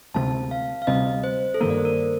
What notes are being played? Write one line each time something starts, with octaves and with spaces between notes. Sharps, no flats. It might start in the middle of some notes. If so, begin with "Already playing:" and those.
D2 C3 G3 C4 A5
F5
F5
D2 C3 G3 C4 D#5
C5
A4
G2 D#3 A#3 A#4
D5
C5
A#4